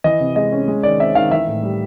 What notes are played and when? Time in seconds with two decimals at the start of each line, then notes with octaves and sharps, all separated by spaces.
0.04 E3 D#5
0.20 C3
0.36 G#3 D#5
0.52 C#4
0.68 G#3
0.83 D#3 D5
1.00 C4 E5
1.15 D#3 F5
1.31 E3 E5
1.47 A2
1.63 G3